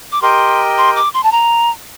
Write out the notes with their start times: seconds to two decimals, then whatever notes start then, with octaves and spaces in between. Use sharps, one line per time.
0.12 D6
0.22 G4 A#4 D#5 G5 C6
0.78 C6
0.96 D6
1.14 C6
1.23 A5
1.32 A#5